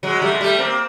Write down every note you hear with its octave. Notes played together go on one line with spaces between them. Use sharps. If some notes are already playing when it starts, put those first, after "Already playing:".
F#3 G#3
G3 A3
G#3
G3 A3
A#3 C4